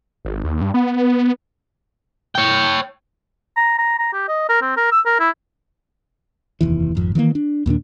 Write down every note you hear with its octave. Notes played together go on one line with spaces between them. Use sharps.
G#1
D#2
G2
B3
C#5 G5
A#5
A#5
A#5
G4
D#5
A#4
C4
A#4
E6
A#4
E4
F1 D#2 E3
G#1 F2
D#3 E3 G#3 A#3
D4
D#2 A#2 D#3 D4